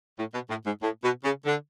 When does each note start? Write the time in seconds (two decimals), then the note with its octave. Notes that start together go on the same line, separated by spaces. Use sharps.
0.18 A2
0.34 B2
0.50 A2
0.66 G#2
0.82 A2
1.04 B2
1.24 C#3
1.45 D3